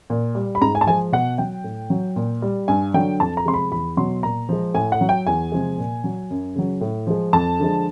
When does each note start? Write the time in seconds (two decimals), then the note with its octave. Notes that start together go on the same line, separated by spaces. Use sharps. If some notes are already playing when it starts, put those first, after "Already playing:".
0.10 A#2
0.35 G3
0.55 B5
0.61 G#2 A#5
0.75 G#5
0.81 A5
0.87 F3 G#3 G#5
1.12 B2 F#5
1.38 F#3 G5
1.64 A2
1.90 F#3
2.16 A#2
2.42 G3
2.68 G2 G#5
2.94 D3 F#3 G5
3.20 F2 A5
3.37 A#5
3.46 C3 F3 G#3 C6
3.54 B5
3.71 E2 B5
3.97 B2 F#3 C6
4.23 A#2 A#5
4.49 F3 G#3
4.74 A2 G#5
4.92 F#5
5.01 F#3
5.09 G5
5.27 E2 G#5
5.52 C3 F3 G#3
5.78 A#2
6.04 F#3
6.30 F#2
6.55 C#3 F#3
6.81 A2
7.07 F3 G#3
7.33 F2 A5
7.60 D3 F3 G#3